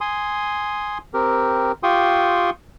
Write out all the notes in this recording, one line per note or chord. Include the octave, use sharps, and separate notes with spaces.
G#5 C6 D#6
C4 G4 A#4
F4 G4 G5 C6 C#6 D#6